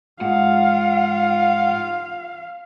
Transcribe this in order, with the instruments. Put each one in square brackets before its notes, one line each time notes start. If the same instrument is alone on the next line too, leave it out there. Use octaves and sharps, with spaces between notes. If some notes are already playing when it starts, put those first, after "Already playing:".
[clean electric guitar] G#2 [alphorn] F4 [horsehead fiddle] F5 [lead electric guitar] F#5